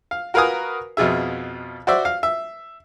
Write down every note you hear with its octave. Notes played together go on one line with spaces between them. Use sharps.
F5
F#4 A#4 B4 F5 G#5 D#6
F2 B2 F4 G#4 E5
F#4 C5 D5 E5
F5
E5